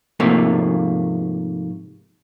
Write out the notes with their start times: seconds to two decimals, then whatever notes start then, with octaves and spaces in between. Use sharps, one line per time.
0.20 G#2 C3 F3 A3 A#3